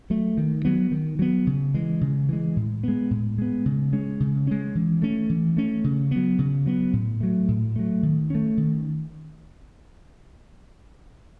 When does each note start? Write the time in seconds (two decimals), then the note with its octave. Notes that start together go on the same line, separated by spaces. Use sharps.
0.10 F#3 A3
0.37 D#3
0.65 F#3 B3
0.92 D#3
1.19 F#3 B3
1.47 C#3
1.74 E3 G#3
2.01 C#3
2.29 E3 G#3
2.56 A2
2.83 G#3 B3
3.11 A2
3.38 G#3 B3
3.66 C#3
3.93 G#3 C#4
4.20 C#3
4.47 G#3 C#4
4.75 E3
5.02 A3 C#4
5.30 E3
5.57 A3 C#4
5.84 C#3
6.11 F#3 B3
6.39 C#3
6.66 F#3 B3
6.93 A2
7.21 F#3 A3
7.48 A2
7.76 F#3 A3
8.03 D#3
8.30 A3 C#4
8.57 D#3